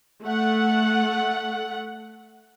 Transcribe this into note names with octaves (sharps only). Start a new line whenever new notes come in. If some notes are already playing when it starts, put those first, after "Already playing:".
A3 F#5